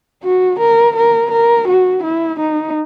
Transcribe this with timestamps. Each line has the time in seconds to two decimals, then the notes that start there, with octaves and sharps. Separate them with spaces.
0.24 F#4
0.60 A#4
0.96 A#4
1.32 A#4
1.68 F#4
2.04 E4
2.40 D#4